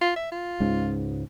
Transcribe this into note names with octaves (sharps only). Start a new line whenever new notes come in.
F4
E5
F4
C#2 G#2 C#3